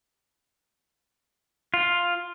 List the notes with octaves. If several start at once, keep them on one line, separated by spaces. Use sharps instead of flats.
F4